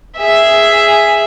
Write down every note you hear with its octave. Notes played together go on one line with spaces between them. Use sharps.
G#4 E5